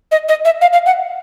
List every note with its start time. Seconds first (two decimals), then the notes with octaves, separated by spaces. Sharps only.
0.11 D#5
0.28 D#5
0.45 E5
0.61 F5
0.73 F5
0.86 F#5